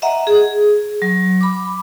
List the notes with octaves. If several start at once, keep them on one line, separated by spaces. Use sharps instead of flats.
D#5 E5 F#5 A#5
G#4
F#3
B5 D6